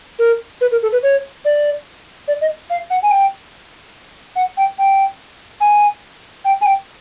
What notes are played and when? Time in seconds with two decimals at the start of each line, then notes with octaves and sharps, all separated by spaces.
0.19 A#4
0.61 B4
0.72 A#4
0.82 A4
0.92 B4
1.03 C#5
1.45 D5
2.28 D5
2.41 D#5
2.70 F5
2.90 F#5
3.03 G#5
3.11 G5
4.36 F#5
4.57 G5
4.78 G5
5.61 G#5
6.45 G5
6.61 G#5
6.65 G5